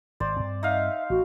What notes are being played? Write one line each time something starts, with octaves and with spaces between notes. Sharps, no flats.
G#1 C5 D5
G2 C4
D#4 E5 F5
A1 F#4